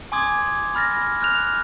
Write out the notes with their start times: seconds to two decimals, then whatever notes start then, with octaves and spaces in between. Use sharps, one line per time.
0.12 G#5 C6 D6 D#6 G#6
0.75 B5 F6 A6 A#6
1.21 F6 F#6 F7